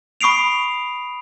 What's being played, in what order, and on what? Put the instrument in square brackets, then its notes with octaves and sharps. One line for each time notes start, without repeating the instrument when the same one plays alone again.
[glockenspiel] B5 C#6 D#6 C7 D7 F7